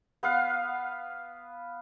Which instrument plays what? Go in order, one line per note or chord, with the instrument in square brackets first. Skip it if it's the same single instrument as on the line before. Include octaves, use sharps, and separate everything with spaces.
[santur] B3 B4 F5